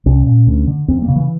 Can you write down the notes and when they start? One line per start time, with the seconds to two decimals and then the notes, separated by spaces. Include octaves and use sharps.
0.06 C2 C#4
0.27 A#2
0.47 D2
0.67 D3
0.88 F2 C4
1.02 A#3
1.08 C#3
1.16 E3